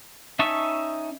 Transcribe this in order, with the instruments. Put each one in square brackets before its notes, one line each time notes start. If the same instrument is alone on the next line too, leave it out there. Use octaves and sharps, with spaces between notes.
[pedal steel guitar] C#4 D#4 E5 A5 C#6